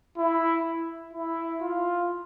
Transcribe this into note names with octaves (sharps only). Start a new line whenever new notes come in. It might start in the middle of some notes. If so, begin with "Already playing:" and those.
E4
E4
F4